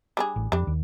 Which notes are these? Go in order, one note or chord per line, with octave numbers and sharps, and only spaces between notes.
G3 D4 G#4
A1
F2 G3 D4
D#2